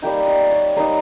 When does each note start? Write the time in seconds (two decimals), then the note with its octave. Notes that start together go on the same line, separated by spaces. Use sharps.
0.02 G3 A#3 D#4 G5
0.28 D#5
0.51 C#5
0.76 G3 A#3 D#4 A#4